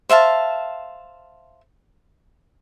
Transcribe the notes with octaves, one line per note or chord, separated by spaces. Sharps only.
C5 E5 F5 A5